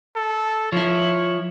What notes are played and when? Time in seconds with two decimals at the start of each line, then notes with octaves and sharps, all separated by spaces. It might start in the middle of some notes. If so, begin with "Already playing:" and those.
0.16 A4
0.72 F3 E4 C#5